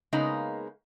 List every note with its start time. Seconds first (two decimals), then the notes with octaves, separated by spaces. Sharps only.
0.13 C#3 G#3 A#3 B3 D#4